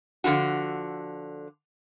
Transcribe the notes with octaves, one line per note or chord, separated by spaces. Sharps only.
D3 F3 F4 F#4